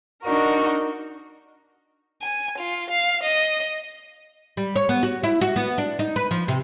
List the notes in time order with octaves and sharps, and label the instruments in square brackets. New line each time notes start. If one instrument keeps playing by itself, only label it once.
[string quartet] D4 D#4 F#4 A#4
[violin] G#5
F4
F5
D#5
[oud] G3
C#5
B3
F#4
E4
F#4
B3
D4
D#4
B4
F3
C3